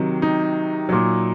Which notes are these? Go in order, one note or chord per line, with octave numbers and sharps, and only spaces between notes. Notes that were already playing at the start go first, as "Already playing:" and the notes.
Already playing: C3 D#3 F#3
D#4
A#2 F#3